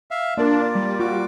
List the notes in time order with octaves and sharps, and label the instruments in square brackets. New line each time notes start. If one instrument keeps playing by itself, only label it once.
[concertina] E5 F5
[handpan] A#3 A#4 [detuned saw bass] D4 [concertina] F4 D5
[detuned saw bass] G3
[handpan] F4 [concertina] F#4 D6